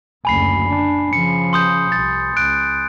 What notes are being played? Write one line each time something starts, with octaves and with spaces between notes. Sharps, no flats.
F#1 D2 G#5 B5 C7
D4
C#3 F3 C#7
C6 D#6 G6
C2 A6
C#2 F#6 D7